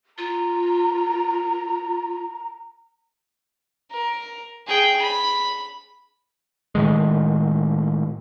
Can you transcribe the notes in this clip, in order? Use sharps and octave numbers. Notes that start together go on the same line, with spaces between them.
F4 A#5
A#4
G#4 G5
B5
A2 D#3 G#3